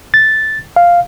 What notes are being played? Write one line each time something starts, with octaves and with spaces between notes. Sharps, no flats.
A6
F5